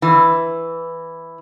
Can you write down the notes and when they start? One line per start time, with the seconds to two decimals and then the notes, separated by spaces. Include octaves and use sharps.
0.02 E3